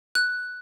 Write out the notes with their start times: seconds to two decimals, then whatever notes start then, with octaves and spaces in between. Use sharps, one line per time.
0.15 F#6